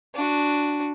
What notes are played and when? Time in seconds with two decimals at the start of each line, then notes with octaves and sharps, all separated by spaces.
0.15 D4 F#4